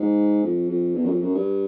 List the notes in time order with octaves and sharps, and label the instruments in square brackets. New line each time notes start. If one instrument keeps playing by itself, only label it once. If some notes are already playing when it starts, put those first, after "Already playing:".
Already playing: [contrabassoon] G#2
F2
F2
E2
F#2
F2
F#2
G2